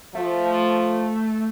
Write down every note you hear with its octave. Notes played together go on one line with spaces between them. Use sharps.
F3 A3